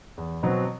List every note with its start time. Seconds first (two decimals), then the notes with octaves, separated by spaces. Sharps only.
0.17 E2
0.43 B2 F#3 C4